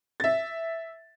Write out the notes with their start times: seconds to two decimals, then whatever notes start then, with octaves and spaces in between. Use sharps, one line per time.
0.20 E5 A6